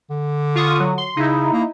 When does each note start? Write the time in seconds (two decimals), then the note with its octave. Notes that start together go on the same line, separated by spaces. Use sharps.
0.10 D3
0.55 F4 C#6 D#6
0.80 F#3
0.98 C6
1.17 C#3 D#4 E4
1.52 A#3